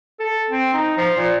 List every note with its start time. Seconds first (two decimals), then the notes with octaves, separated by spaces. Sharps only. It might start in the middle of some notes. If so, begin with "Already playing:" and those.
0.19 A4
0.50 C4
0.74 D#4
0.97 F3
1.17 A#2